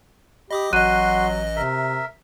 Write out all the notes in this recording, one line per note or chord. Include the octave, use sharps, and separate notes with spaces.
G4 D#5 B5 D6 D#6
A1 F#3 F#4 D#5 C6 F#6 D#7
C3 A#4 E5